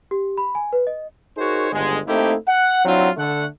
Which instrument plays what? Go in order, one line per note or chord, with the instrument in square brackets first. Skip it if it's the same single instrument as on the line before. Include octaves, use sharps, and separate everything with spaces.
[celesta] G4
B5
G#5
B4
D#5
[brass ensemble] D#4 F#4 G#4 A#4 C5 C#5
G1 D#2 D3 G#3
A3 A#3 C4 D#4 E4 G4
F#5
F#3 C4 D4 E4 F4
D3 A3 F#5